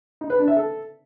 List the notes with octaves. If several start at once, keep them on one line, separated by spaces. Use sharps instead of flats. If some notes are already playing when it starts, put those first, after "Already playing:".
D#4
B4
D4
E5
A4